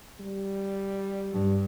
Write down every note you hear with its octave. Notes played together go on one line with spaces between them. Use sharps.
G3
G2